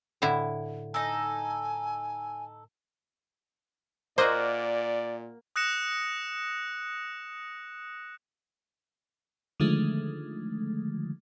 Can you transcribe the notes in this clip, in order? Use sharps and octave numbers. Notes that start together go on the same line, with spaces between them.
A2 D3 E4
D#4 A4 G#5
A#2 A#3 F#4 C5 D5 D#5
D#6 F#6 A#6 C#7 E7
D3 D#3 F3 G#3 A3